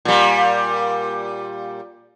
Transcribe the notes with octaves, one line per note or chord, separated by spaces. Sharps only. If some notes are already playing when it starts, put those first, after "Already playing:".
A#2 G3